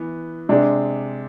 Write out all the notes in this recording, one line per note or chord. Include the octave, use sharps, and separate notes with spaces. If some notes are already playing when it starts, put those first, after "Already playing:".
Already playing: E3 B3
C3 G#3 D4